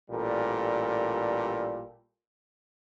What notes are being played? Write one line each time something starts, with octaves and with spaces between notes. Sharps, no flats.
A1 A#2 G3 A4 A#4